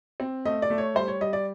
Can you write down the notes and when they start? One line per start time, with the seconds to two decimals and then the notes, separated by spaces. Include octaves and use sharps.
0.20 C4
0.45 A3 D#5
0.62 D5
0.70 A3
0.78 C#5
0.95 G3 C5
1.08 C#5
1.21 G3 D#5
1.33 D5